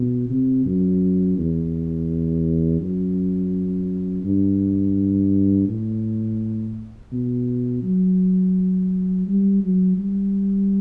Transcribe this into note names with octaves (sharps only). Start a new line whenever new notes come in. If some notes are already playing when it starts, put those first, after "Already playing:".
Already playing: B2
C3
F#2
E2
F#2
G2
A2
B2
F#3
G3
F#3
G3